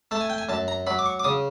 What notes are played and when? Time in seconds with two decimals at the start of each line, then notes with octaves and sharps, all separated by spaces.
0.11 A3 A5
0.21 G#5
0.30 G5
0.38 G#5
0.49 F#2 A5
0.68 A#5
0.87 F#3 B5
0.99 D6
1.06 C#6
1.20 D6
1.24 C#3 D#6